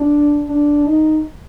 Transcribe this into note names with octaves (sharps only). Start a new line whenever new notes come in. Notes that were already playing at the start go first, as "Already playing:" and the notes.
Already playing: D4
D4
D#4